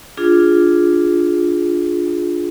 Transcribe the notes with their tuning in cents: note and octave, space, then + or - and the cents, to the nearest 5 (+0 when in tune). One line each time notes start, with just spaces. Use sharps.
D4 +0 F4 +0 G#4 +0